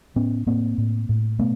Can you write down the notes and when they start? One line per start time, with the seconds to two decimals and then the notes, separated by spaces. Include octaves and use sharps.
0.16 A2 B3 C#4
0.47 A2 A#3 C4
0.78 A2
1.09 A2
1.39 B2 A3 B3